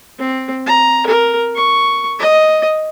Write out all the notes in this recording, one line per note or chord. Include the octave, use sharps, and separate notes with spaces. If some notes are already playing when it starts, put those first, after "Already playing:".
C4
A#5
A#4
C#6
D#5